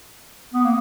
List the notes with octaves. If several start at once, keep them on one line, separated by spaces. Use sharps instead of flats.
B3
A#3